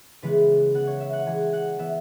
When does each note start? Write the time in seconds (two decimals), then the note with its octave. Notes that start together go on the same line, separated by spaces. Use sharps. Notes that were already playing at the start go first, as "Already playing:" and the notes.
0.22 C#3 E3 G#3 B3 B4
0.74 E3 B3 F#5
0.87 C#5
1.00 E5
1.13 F#5
1.26 E3 G#3 B3 G#5
1.53 F#5
1.79 E3 B3 E5